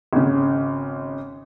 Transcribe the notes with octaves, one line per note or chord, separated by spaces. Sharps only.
G#1 C#3